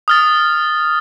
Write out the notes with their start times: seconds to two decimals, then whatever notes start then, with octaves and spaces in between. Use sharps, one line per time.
0.08 D#6 F6 A6